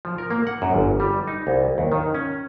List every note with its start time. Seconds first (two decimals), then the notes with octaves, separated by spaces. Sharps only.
0.05 F3
0.18 A#4
0.31 A#3
0.47 F#5
0.62 F#2
0.74 G1
1.00 G3
1.28 D#4
1.47 C2
1.78 D#2
1.92 D#3
2.14 C#4